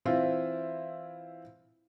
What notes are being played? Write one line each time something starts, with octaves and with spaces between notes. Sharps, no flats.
E3 C4 E4 F4